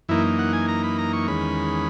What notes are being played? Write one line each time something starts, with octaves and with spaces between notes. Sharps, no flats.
F#2 E3 A#3 D#4 E4
F#5
G#5
A#5
B5
A#5
C#6
E2 D#3 G#3 C#4 B5